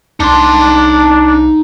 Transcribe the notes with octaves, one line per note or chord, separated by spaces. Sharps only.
C2 D4 D#4 A5 C6